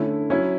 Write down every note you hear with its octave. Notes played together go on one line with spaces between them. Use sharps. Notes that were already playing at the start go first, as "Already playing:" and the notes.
Already playing: D3 A3 C#4 E4
F#3 C#4 E4